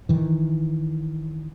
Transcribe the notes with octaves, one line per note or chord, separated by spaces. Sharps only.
D#3 E3